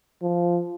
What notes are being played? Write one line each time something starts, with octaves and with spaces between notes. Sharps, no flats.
F3